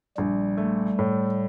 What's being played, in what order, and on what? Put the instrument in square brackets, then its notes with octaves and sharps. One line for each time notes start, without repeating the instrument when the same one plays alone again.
[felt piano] A#1 [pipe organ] G3
[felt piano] A3
A2